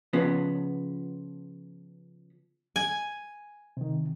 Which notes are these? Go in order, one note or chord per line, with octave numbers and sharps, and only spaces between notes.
C#3 F3 B3
G#5
C3 D#3